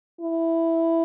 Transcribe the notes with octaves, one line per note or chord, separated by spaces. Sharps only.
E4